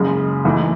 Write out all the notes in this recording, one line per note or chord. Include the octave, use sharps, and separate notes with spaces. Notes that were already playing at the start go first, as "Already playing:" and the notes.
Already playing: F#1 F#2 C#3 G#3
F#1 F#2 E3 A3 D#4